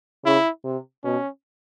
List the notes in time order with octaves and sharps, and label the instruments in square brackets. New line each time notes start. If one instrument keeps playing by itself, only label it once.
[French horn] C#3 [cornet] E4
[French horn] C3
[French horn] B2 [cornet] C#4